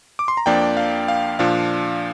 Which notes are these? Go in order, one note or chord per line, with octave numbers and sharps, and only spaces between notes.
D6
C6
A#5
F2 F3 A#3 D4 D5 G5
F5
F5
A#2 F3 D4 F5